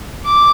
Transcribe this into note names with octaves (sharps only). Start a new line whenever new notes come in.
D6